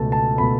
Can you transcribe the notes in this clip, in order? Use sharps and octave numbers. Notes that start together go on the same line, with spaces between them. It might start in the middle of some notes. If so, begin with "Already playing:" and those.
Already playing: C#2 B2 A3 A5
A5
B2 A3 B5